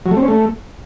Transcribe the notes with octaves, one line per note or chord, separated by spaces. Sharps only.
F#3
A3
C4
C#4
A3